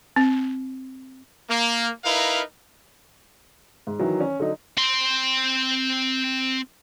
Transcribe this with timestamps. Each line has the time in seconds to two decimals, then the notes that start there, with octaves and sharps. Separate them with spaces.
0.16 C4
1.49 A#3
2.05 D#4 E4 A#4 B4 F5
3.87 G#2
3.99 D#3 E3 F#3
4.21 C#4
4.40 D3 F#3 D#4
4.77 C4 C6